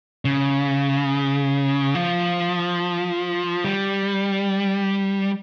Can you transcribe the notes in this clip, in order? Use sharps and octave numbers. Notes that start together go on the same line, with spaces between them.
C#3
F3
G3